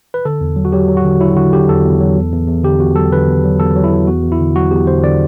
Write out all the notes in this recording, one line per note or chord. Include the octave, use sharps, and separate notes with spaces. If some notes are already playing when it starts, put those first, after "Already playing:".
B4
D3 A4
E2
F#3
F#4
F#3 G4
F#3
F#4
D3
F#3 E4
D3 F#4
D3 G4
E2 A4
E2
F#3
E2
E2
E2
D3 G4
E2 F#4
F#3 A4
D3 B4
E2
F#3
E2 A4
F#3
E4
F#3
E2 F#4
E2
E4
D3
F#3 F#4
E2 G4
D3 C5
D3 D5